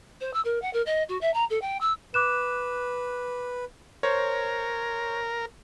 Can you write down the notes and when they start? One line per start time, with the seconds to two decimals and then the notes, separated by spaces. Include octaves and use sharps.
0.21 C5
0.34 E6
0.45 A#4
0.62 F#5
0.73 A#4
0.86 D#5
1.09 F#4
1.21 E5
1.34 A#5
1.50 A4
1.62 G5
1.81 E6
2.14 B4 D6 F#6 E7
4.03 A#4 C5 C#5